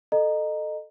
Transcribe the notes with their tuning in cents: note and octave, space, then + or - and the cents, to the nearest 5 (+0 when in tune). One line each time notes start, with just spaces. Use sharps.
A4 +0 D#5 -25 A#5 +0